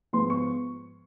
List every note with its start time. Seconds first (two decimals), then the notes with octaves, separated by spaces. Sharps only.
0.13 G#2 F3 G#3 B3 C6
0.30 C#6